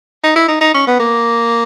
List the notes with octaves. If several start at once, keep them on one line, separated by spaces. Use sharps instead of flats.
D#4
E4
D#4
D#4
C#4
B3
A#3